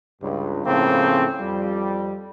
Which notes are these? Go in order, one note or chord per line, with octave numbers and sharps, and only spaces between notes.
C#2 G2
A2 C#3 F3 A#3 C4
F2 G3